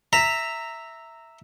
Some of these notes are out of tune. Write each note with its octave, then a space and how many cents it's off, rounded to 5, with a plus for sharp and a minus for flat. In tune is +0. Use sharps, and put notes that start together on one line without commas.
E5 -5 A#5 -15